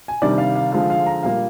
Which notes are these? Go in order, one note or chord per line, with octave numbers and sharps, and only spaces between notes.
G#5
C3 D#3 G3 D4 D5
F5
F5
D3 F3 G#3 F5
F5
A#5
A#2 G3 A#3 F5